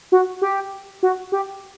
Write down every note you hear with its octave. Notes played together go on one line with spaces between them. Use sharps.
F#4
G4
F#4
G4